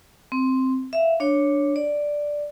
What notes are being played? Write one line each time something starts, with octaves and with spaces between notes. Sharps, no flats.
C4
E5 F5
D4 C#5
D5